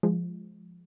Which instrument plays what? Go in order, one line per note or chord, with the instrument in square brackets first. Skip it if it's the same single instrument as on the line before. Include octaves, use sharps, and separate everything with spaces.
[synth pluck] F3 G#3